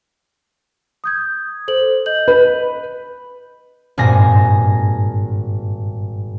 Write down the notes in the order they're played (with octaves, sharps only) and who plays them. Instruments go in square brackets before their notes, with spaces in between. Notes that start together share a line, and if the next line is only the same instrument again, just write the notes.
[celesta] D#6 G6 G#6
A4 C5 F#7
D#5 G6 F#7
[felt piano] B4
[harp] G#1 G2 A#2 G#5 A#6